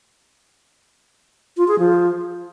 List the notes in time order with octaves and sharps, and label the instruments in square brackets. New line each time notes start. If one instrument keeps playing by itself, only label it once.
[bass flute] F4
G#4
F3